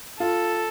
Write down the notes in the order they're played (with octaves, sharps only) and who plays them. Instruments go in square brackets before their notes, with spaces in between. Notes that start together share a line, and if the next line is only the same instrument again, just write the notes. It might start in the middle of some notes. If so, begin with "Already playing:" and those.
[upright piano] F4 [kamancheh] A4